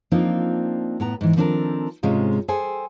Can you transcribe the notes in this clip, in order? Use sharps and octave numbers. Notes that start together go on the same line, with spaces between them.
F3 A#3 C4 D4 D#4 F4
A2 B3 A#5
G#2 E3
D#3 F3 C4 D4 A4 A#4
G#2 C3 G#3 C#4 F4
G#4 A4 C5 G5 G#5